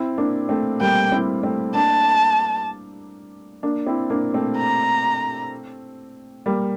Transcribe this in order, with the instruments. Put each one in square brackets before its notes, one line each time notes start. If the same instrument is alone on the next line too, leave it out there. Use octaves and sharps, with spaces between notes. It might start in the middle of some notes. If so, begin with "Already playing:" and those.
Already playing: [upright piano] C4 E4
A#3 D4
A3 C4
[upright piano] G3 A#3 [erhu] G5
[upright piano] C4 E4
A3 C4
[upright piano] A#3 D4 [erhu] A5
[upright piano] A#3 D4
C4 E4
A#3 D4
A3 C4
[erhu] A#5
[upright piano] G3 A#3